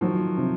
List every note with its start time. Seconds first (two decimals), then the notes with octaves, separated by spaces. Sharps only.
0.01 D#3 F3 F#3
0.38 C3